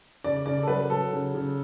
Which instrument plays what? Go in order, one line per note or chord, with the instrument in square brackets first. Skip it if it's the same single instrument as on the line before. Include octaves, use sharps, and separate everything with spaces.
[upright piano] C#3 D5
C#3 D5
A4
F#3 B4
F#3 A4
C#3
C#3